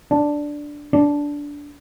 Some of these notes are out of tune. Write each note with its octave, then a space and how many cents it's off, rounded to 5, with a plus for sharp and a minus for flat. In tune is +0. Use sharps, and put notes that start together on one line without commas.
D4 +0
D4 -15